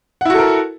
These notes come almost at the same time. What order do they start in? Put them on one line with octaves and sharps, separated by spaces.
F#5 E4 F#4 A4 A#4